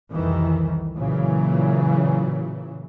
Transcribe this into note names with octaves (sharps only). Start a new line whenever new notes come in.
C2 F2 D#3 E3
A#2 C#3 E3 F#3